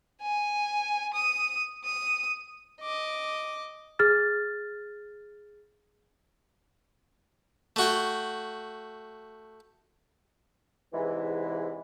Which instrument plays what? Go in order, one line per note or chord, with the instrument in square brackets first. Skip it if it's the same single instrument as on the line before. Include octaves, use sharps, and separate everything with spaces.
[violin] G#5
D#6
D#6
[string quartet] D#5 D6
[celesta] G#4 F6 A6
[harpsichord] A3 F#4 G5
[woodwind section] E2 G#2 C3 E3